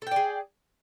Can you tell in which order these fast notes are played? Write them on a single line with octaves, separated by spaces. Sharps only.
A4 G5 D5 G#4